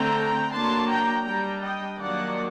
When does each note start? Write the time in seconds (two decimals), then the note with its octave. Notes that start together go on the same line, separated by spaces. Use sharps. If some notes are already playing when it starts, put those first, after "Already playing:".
Already playing: D3 A3 C4 G5 A#5
0.51 F#3 A#3 D4 A5 C6
0.89 G5 A#5
1.25 G3 D4 G5 A#5
1.62 D#5 G5
1.99 D#3 F#3 A#3 D4 D5 F#5